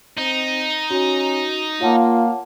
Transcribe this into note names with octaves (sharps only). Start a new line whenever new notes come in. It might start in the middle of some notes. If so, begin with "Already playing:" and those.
C4 D#4
C#4 F#4
A#3 F4 C#5 F#5 A5